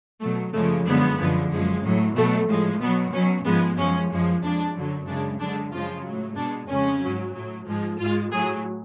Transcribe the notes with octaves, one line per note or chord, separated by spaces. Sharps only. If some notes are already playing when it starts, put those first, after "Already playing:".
B2 F#3 A3
F#2 C#3 F3 G#3 A3
F#2 D3 F3 G#3 B3
F#2 D3 F3 G#3
F#2 F3 G#3
A2 F#3
B2 F#3 A3
A2 F3 G#3
B2 F#3 B3
B2 F#3 C#4
G#2 F3 G#3 B3
F#2 F3 G#3 C#4
F#2 F3 G#3
F2 F3 G#3 D4
F#2 D3 F#3
F#2 C#3 G#3 D4
F#2 D3 G#3 D4
F#2 C#3 F3 G#3 F4
A2 F#3
B2 G#3 D4
F2 C#3 G#3 C#4
G#2 F#3
A2 F#3
G#2 F3 G#3
G#2 G#3 F4
A2 F#3 G#4